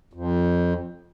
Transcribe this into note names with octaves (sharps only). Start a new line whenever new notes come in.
F2